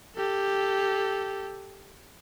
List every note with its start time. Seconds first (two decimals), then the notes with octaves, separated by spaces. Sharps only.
0.16 G4 A4